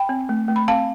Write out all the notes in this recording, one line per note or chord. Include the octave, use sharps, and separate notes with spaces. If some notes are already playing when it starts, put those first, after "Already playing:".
Already playing: G5 B5
C4
A3
A3
B5
C4 F5 A5